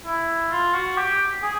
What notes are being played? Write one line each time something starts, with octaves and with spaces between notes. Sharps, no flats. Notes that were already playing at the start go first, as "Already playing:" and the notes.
E4
F4
F#4
G4
G#4